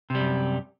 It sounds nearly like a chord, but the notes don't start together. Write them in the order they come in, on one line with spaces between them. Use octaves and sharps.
C3 G3 F#2